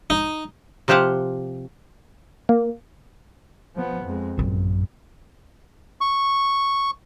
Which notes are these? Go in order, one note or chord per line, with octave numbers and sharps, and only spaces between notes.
D#4
C3 F3 G4 C5 F5 F#5
A#3
F3 B3
F2 G#3
A1 F#2 A#2
C#6